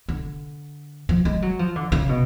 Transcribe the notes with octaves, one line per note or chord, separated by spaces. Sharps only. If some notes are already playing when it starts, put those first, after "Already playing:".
D3
F3
G#3
F#3
F3
D3
C#3
B2